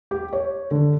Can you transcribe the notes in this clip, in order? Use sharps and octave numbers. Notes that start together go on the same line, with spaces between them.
G4
C#5
D3